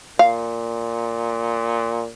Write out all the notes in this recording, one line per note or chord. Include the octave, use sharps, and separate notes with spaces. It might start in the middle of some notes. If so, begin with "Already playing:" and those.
A#2 F5